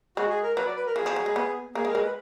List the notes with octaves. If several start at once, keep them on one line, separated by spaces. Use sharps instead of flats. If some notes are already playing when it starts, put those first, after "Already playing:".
G#3 F#4
G#4
A#4
F#3 B4
D5
B4
A#4
F3 G#4
F3
F#3
G#3
B3
A#3 G#4
G#3
A#4
G#3
B4